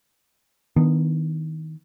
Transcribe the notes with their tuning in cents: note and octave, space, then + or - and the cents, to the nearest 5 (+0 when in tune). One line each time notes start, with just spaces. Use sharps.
D#3 +25 B3 +0 D4 +30